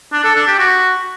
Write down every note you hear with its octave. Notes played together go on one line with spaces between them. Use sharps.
D4
A4
D4
G4
F#4